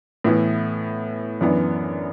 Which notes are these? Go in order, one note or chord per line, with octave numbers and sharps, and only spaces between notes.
A2 E3 B3 E4
F#2 E3 B3 D4